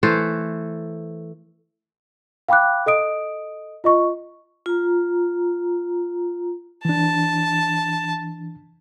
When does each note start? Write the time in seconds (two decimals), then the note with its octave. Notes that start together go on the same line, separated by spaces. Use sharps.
0.03 E3 A3 A4 C5
2.48 F5 G5 B5 D6 F#6
2.86 A4 D#5 D#6 D7
3.84 F4 D#5 C#6
4.66 F4 A#5
6.85 E3 D4 A5